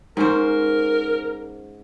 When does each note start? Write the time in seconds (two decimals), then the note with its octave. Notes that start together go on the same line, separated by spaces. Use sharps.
0.17 G#2 C#4 A#4 C5